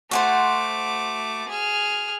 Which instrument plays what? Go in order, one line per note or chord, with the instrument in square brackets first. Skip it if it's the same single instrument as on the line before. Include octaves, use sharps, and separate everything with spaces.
[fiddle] A3 D6 [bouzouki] F#4 G4 C5
[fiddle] G#4 F6